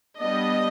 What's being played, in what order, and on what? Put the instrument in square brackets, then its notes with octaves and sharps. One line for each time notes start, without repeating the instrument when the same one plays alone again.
[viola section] G3 B3 D4 D#5